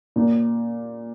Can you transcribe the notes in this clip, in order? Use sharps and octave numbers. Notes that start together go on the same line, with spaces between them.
A#2